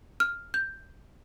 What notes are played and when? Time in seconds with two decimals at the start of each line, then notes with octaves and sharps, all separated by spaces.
0.20 F6
0.54 G6